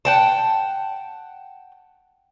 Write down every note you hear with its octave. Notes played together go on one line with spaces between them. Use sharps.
F#5 G5 A5